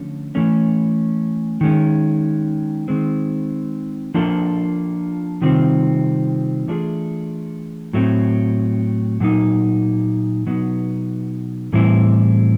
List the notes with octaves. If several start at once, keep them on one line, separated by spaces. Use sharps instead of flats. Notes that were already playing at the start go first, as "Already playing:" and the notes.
Already playing: D3 F3 A3 C#4
E3 A3 C#4
D#3 G#3 C#4
D#3 G#3 C4
F3 A#3 D4 F4 A4
C3 D#3 G3 C4 F4
E3 A3 D4 F4 G#4
A2 F#3 A3 C4
A#2 F#3 A#3 D#4
B2 F#3 B3 D#4
A2 E3 G3 C4 E4